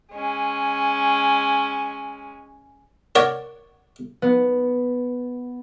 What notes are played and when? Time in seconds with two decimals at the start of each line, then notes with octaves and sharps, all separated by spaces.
0.12 G#3 C#4
3.15 A#4 C#5 D5 F#5
4.22 B3